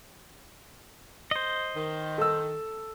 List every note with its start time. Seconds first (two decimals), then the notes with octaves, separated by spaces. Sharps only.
1.31 C5 D#5
1.76 D#3
2.18 A4 E6